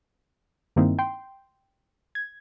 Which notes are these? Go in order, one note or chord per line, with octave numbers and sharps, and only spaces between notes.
G2 D#3 A#3 C4 D#4 E4
G5 C6
G#6